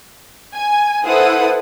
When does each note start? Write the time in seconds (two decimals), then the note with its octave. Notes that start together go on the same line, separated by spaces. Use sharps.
0.55 G#5
1.04 E4 A4 B4 C5 F#5 D#6